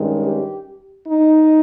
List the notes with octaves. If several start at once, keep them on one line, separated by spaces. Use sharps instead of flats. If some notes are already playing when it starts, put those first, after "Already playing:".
Already playing: G2 D#3 G#3 C#4
G4
D#4